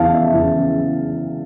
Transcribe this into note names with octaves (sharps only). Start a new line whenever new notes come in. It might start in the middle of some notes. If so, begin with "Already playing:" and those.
Already playing: E2 C#3 E3 F5 A5
E5
E2 C#3 E3